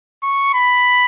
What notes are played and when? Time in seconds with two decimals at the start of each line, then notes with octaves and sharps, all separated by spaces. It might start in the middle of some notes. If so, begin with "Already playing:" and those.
0.23 C#6
0.54 B5